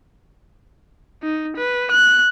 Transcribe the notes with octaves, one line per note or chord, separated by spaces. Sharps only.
D#4
B4
F#6